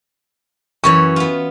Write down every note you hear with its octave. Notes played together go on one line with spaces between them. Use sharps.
F#2 E3 C#5 C#6
B3 F4